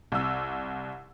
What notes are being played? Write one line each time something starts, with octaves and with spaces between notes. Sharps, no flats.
C2 E6